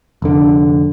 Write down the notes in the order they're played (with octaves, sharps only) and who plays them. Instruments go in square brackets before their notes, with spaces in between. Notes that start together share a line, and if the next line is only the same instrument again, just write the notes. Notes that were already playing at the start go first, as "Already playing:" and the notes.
[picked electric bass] F1 D3